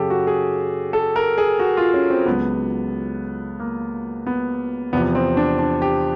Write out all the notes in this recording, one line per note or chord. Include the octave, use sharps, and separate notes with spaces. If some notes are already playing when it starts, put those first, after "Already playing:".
Already playing: F#2 C#3 F#3 G4 A4
F#4
G#4
A4
A#4
G#4
F#4
F4
C#4
C4
C#2 C#3 F#3 B3
A#3
B3
E2 C3 F3 B3
C4
D4
D4
G4